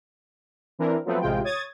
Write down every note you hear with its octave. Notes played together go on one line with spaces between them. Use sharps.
E3 C4 D4 A#4
F3 F#3 A3 B3 C4 B4
A1 C3 G#3 F4 G5
C#5 D#6 G#6 A6